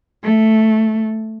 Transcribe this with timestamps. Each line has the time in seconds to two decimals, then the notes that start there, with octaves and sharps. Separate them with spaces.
0.24 A3